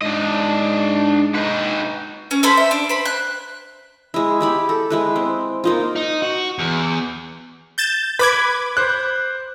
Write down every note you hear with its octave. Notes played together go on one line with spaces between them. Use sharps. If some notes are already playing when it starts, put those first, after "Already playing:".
G#2 D4 D#5
D#4 B4
C#4
A4 C5 B5 C6
E5
D4
C5 B5
F#6
G#3 E4
E4 G4 B5
A4
G#3 E4 B4
C4
A#3 D#4 F4
D#4
F#4
E2
G6 A6 E7
B4 B5 D6 G#6
C5 F#6